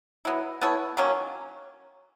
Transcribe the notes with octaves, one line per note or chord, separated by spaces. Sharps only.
F#3 B3 E4
B3 E4 A4 C#5
D#3 F#3 A#3 C#4